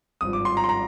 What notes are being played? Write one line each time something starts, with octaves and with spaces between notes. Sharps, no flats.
G#1 G2 F3 D#6
D6
C6
A#5
C6
A#5